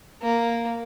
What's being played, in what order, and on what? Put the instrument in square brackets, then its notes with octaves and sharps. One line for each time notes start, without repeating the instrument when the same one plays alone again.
[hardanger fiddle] A#3